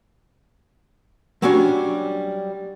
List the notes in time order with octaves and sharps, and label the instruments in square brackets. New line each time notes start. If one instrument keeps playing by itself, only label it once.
[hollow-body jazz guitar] F#3 G3 C#4 D4